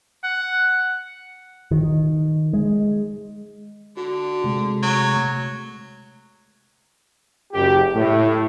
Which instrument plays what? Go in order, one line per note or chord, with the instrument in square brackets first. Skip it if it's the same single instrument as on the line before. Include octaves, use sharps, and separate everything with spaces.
[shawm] F#5
[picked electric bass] D#3
G#3
[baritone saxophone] D3 [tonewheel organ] F#4
[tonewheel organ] C3 G#3 A3
[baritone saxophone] F#3
[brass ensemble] F#1 G4
A2